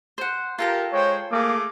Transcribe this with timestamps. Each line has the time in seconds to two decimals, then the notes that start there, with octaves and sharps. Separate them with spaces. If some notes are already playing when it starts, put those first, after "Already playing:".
0.18 C5 F#5
0.59 F4 G4 A4 A#4 A#5
0.92 G#3 C5 C#5 G5
1.31 A3 A#3 G#4 D6